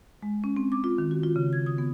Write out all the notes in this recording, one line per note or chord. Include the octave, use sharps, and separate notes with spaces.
G#3
C#4
C4
D6
F4
D#3
F#4
F4
C#3
G#6
D#6
B3